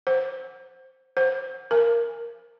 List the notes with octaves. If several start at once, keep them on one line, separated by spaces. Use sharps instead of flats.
C5
C5
A#4